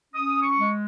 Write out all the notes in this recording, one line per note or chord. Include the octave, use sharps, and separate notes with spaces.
C#4 D#6
C#6
G#3